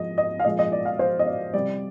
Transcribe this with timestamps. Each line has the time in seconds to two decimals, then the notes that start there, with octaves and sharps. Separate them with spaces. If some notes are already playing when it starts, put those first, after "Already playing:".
Already playing: F3 G#3 D#5
0.18 D#5
0.39 F5
0.45 A#2 F3 G#3 D#5
0.59 D#5
0.72 D5
0.85 F5
0.99 C5
1.19 D#5
1.27 D5
1.54 C3 G3 D5